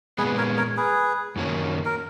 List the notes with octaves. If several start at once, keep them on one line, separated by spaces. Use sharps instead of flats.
A#2 G#3 B3 G#4 B4
A#4 C#5
A#4 C#5
G#4 B4
F#2 D#3 F#3 A#3 C#4
A#4